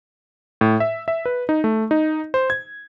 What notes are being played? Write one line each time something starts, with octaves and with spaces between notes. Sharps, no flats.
A2
E5
E5
B4
D#4
A3
D#4
C5
G#6